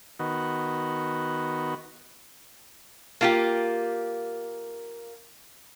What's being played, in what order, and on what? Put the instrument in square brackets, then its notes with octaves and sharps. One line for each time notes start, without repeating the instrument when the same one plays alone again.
[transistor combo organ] D#3 B3 F#4
[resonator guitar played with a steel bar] A#3 F4 G4